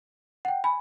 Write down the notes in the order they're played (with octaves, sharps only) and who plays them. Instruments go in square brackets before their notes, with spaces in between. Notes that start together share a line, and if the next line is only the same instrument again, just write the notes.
[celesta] F#5 G5
[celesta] G#5 [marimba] B5